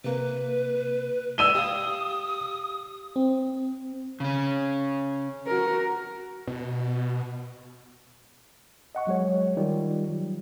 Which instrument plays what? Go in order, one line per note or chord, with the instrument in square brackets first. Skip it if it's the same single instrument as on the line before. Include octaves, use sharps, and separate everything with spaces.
[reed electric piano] C3 A#3 [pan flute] B4
[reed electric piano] G#3 [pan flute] D5 [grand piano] E6 D#7 G7
[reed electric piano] G4 F5 [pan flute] D#6
[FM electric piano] C4
[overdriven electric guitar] C#3 C#4
[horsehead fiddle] F#4 A#4
[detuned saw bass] B2
[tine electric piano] D#5 F#5 C#6
F#3 G#3 C#5
D#3 G3 F4
F#3